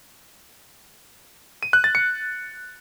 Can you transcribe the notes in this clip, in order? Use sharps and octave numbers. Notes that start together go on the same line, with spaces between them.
D#7
F#6
A6
C#7